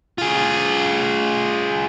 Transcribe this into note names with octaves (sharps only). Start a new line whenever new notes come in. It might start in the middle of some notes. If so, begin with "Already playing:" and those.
F4 G#4